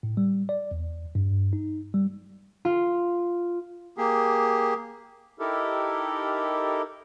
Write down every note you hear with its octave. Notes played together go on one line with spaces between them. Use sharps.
A2
G3
D5
E2
G2
D#4
G3
F4
A#3 G4 G#4
D#4 E4 G4 A4 A#4